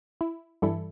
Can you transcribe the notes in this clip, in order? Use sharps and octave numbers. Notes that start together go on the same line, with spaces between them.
E4
G2 E3 G3 E4 A4